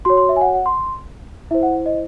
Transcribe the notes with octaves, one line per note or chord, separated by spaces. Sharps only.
F#4 C#5 C6
C6
E5
G#5
F#5
F#5
C6
E4 C5 E5
F#5
D#5